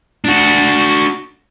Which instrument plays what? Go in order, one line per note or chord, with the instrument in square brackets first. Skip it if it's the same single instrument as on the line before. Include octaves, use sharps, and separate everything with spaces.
[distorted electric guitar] D4 F#4